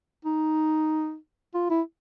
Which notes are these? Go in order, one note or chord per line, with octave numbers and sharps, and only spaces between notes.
D#4
F4
E4